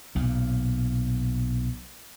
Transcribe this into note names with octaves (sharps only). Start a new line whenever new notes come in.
B1 A#2